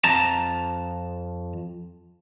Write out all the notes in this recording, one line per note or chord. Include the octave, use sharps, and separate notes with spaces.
F2 A5 A#5